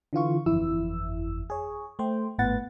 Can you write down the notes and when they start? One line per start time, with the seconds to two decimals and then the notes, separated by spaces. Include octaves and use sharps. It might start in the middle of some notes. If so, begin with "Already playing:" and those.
0.13 D3 E3 F4 C#6
0.46 G1 F2 E3 E4 E6
1.50 G#4 C#5
1.99 A3 C5 G5
2.38 G#1 A2 B3 B4 F#5 A6